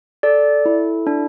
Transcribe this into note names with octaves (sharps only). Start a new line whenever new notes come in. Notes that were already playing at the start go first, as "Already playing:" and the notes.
A4 D5
E4
D4